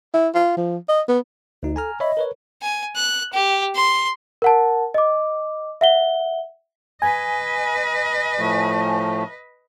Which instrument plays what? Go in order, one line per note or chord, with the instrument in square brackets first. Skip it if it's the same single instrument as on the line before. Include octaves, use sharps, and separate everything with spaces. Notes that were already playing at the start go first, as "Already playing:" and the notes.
[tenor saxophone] E4
F4
F3
D#5
B3
[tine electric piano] D2 D#4 [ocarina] F#4
[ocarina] A4 [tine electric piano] G#5 A#5 F6
[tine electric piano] C#5 E5 B5 [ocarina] D#5
[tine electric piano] A#4 B4 C#5
[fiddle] G#5
F#6
G4
C6
[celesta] A#4 F#5 A5
D#5 D6
E5 F#5 G7
[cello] B4 D#5 [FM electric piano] G#5
[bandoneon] A2 F3 A3